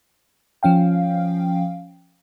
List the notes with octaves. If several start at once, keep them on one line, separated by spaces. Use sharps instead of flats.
F3 C#4 F5 G5